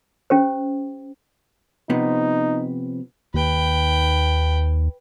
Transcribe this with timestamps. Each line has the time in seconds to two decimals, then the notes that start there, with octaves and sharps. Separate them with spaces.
0.30 C#4 G4 C5
1.90 C3 F3 B3 D#4
3.34 D#2 B4 G5